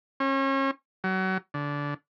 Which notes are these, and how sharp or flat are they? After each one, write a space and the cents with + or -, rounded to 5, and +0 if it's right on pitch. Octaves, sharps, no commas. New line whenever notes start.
C#4 -35
F#3 +30
D3 -20